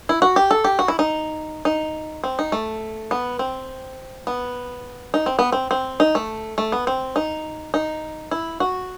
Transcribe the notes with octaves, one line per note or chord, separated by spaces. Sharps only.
E4
F#4
G4
A4
G4
F#4
E4
D#4
D#4
C4
D#4
A3
B3
C4
B3
D#4
C4
B3
C4
C4
D#4
A3
A3
B3
C4
D#4
D#4
E4
F#4